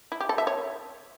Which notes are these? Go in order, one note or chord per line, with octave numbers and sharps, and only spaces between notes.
E4
G4
A4
E5
C#5